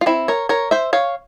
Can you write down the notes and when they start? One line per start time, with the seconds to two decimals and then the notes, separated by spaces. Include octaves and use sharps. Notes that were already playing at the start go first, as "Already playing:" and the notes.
0.01 F4
0.06 C4 E4
0.28 A#4 C#5
0.49 A#4 C#5
0.71 C5 E5
0.93 C#5 F5